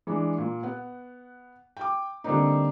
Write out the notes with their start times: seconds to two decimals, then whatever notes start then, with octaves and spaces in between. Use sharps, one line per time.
0.07 E3 G#3 D4
0.38 A#2
0.63 B3 F#5
1.77 G5 D6
2.24 D3 G3 A#3 C4 D4 D#4